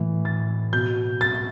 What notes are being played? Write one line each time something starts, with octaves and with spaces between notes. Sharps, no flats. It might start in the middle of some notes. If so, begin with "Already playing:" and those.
Already playing: A2 E3
A6
B2 G6
A6